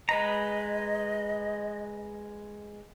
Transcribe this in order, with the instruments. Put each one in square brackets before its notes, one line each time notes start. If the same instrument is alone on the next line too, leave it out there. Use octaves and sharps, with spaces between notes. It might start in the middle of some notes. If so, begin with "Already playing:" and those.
[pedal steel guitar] G#3 B4 A#5 [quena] D#5